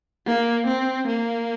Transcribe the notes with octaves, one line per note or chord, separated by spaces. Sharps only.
A#3
C4
A#3